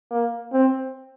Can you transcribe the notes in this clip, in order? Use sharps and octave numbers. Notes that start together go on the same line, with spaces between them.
A#3
C4